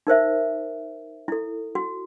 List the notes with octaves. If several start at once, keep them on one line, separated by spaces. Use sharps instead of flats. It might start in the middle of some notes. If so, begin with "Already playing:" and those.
D#4 A#4 C5 E5
E4 A4
F#4